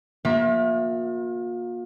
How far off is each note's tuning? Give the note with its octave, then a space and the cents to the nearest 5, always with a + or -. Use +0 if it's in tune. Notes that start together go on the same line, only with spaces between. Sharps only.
A#3 +25 F4 +45 E5 +0